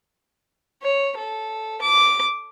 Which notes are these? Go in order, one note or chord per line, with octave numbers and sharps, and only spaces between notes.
C#5
A4
D6